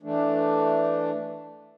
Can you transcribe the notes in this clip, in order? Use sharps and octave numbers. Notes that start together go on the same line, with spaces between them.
E3 A3 D4